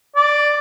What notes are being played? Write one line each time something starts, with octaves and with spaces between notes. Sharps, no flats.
D5